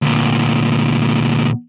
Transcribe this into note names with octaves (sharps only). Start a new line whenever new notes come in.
D2 A#2